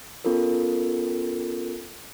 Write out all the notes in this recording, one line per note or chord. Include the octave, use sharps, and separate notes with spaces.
B3 C#4 F4 A4 A#4